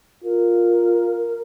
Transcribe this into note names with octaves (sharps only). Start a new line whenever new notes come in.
F4 A#4